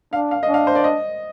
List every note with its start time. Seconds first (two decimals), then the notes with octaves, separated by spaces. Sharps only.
0.13 D4 F5
0.31 F5
0.43 D#5
0.48 D4
0.54 F5
0.67 C5
0.75 D5
0.84 D#5